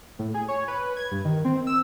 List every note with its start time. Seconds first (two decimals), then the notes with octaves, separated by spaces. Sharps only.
0.19 A2
0.34 G#4
0.48 C#5
0.68 B4
0.97 G#6
1.12 G2
1.25 D#3
1.45 C4
1.67 E6